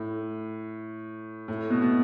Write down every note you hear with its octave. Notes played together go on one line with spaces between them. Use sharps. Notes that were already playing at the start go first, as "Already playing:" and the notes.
Already playing: A2
A2
B2
B2